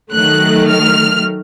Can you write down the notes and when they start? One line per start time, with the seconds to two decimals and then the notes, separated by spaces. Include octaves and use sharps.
0.12 D#3 F#3 A3 F#6
0.68 F6